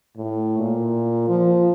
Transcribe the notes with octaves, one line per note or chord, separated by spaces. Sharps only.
A2
A#2
F3